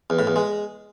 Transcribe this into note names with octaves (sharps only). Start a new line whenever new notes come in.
E2
A2
E2
G#3